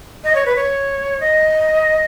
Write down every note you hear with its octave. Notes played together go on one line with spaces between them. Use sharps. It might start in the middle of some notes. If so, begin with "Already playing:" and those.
D#5
C#5
B4
C#5
D#5